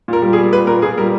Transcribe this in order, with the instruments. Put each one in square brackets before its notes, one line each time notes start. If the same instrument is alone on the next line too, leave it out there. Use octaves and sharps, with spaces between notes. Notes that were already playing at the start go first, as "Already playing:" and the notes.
[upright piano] A#2 A#4
G3
G#4
G3
A#2 B4
A#2 A#4
A#2 G#4
G3 A#4